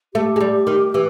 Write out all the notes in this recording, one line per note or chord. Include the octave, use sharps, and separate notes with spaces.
A3 G4
G#3
G3
D#3
E3